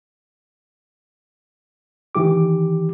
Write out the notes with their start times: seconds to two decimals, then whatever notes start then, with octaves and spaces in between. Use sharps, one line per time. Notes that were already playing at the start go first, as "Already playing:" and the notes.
2.15 D#3 E3 G4 D6